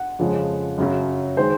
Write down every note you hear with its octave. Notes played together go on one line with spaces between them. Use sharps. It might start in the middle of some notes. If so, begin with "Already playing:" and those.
Already playing: F#5
F2 C#3 F3 G#3
F#2 C#3 F#3
D#3 G#3 C5